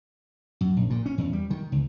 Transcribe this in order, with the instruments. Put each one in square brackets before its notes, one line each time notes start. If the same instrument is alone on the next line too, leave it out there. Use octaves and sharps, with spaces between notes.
[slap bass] F#2
A#1
A#2
C#4
E2
G3
D#3
C#2